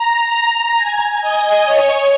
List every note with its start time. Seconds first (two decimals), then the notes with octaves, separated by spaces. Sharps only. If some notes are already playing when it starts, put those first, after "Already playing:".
Already playing: A#5
0.31 A#5
0.76 G#5
1.21 D#5
1.65 C#5